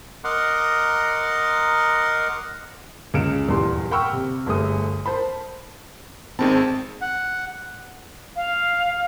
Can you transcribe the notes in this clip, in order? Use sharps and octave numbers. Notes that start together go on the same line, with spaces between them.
A#4 D#5 F#5 A#5 C6 D6
C#2 C#3 G#4 F6 D7 E7
D#1 E2 G2 G3 C6
F#5 G5 B5 C#6 E6 F6
C3
G1 A3 G#4 D#6
A#4 C5 A5 B5
G#1 D#3 C4 G#4 A5
F#5
F5